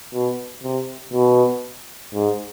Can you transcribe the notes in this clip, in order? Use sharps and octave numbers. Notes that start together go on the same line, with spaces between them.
B2
C3
B2
G#2